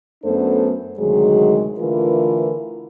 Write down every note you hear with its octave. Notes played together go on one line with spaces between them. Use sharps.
F#2 A3 B3 D4 A4 C5
D2 C3 D#3 F#3 G#3 G#4
D3 E3 A3 F4 A#4 B4